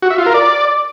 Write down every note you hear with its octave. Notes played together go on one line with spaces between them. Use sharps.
F#4
E5
F4
A#4
D5